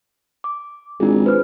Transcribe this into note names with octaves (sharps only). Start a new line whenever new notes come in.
D6
G#1 D4 F4 G#4
B4 C5 F6